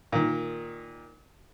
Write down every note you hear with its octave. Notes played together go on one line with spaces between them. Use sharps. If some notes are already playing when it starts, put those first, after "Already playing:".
A#2 D#3